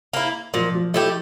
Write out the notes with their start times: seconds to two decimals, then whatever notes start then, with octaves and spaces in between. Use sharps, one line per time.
0.13 A#3 E4
0.54 A#2 F3
0.74 F3
0.94 F3 A3 E4 G4